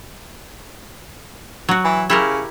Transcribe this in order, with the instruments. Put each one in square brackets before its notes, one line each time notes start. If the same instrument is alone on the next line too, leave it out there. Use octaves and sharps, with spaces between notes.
[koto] F#3 F#4
[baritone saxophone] E3
[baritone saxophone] C#3 [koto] E4 G4 A#4